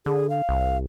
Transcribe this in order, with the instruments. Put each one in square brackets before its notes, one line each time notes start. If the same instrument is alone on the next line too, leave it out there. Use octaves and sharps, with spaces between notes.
[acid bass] D3 [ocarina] G#4
[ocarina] F5
[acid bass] C2